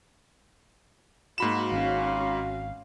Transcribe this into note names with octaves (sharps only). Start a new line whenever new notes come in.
G#2 A#3 F#4 B5 E7
G#1 C#4 F#4 F5